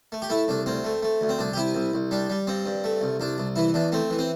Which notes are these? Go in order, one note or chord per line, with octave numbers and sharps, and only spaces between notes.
A3
G4
A3 E4
C2 D4
D2 C4
A3
A3
D2
C4
C2 D4
G4
C3 E4
C2
C2
G3 D4
G3
G2 C4
G2
A3
C2
C2 D4
C2
E3 E4
E2 D4
A3 C4
E3
C4